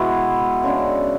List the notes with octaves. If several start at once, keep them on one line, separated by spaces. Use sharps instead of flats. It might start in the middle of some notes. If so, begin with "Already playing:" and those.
Already playing: B2 G#3 B3 E4 F#4
C#3 G#3 D4